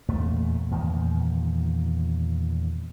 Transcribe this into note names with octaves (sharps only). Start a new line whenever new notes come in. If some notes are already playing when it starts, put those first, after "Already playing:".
E2 A#2 A3
E2 A#2 D#3